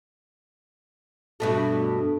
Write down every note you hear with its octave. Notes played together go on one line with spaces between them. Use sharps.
G2 B2 A3